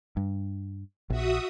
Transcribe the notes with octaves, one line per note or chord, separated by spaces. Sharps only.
G2
A#1 F#4 E5 D#6